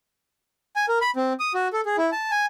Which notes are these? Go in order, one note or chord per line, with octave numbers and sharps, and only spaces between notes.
G#5
A#4
B5
C4
D#6
F#4
A4
G#4
E4
A5
G#5